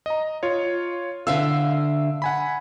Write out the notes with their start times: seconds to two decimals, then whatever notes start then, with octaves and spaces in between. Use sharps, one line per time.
0.06 D#5 A#5
0.43 F4 C#5
1.27 D3 E5 F5 E6
2.22 F#5 G#5 B5